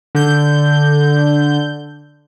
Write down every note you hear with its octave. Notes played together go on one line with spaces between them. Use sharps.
D3 G6